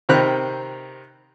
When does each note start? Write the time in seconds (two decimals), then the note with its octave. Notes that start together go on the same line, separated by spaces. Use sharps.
0.09 C3 D#3 C4 A#5 B5 F#6